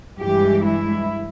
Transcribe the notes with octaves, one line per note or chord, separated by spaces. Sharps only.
G2 E3 G#3 G4
E4